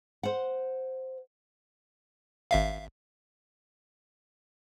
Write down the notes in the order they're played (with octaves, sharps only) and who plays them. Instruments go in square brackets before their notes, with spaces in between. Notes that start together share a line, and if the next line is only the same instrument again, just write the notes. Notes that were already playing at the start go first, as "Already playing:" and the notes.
[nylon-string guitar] C5 F#5
[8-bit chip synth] G#1 E5 F5